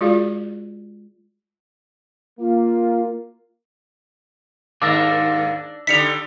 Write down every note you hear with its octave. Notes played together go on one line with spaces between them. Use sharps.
G#3 F4 F#4 G#4 D5 F5
A#3 F4
D#2 G#2 A#3 D4 D6 E6 A#6
D3 G3 D#4 B6 C#7 F7